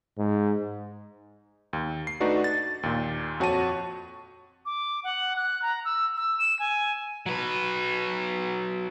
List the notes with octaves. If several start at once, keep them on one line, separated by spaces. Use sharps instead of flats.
G#2
D#2
C7
A3 D4 D#4 F#4 B4 D5
A6
D#2 A#2
F2 F#4 C#5 A5 D#7
D6
F#5
F#6
A#5
E6
E6
E7
G#5
F#3 B4